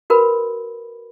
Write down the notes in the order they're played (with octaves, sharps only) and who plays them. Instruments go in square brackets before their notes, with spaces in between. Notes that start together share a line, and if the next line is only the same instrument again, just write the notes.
[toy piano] F#4 A#4 B4 B5